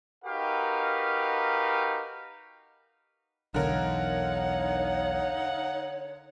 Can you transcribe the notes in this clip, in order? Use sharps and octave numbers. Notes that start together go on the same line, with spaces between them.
D#4 F#4 G4 A#4 B4 F5
B1 E2 D3 D#4 A#4 C#5 F5 F#5